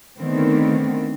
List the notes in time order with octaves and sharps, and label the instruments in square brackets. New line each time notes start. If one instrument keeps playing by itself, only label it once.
[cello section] D3 D#3 A3 B3 C4